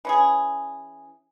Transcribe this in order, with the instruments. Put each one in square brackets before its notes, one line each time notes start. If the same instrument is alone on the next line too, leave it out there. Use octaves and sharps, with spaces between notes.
[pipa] E3 C#4 G#4